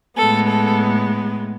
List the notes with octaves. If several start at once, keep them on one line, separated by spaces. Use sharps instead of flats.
A2 G#3 B3 A4
A4